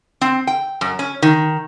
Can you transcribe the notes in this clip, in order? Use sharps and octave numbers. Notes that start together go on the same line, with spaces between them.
C4
G5
F#2
C#4
D#3